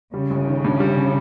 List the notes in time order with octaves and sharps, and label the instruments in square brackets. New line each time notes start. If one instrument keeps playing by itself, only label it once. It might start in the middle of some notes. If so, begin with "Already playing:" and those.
[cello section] C#3 [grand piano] G3
[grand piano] G1
D#3
G2
G3